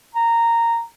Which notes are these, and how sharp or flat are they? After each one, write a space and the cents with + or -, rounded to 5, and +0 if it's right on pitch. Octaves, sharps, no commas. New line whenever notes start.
A#5 -10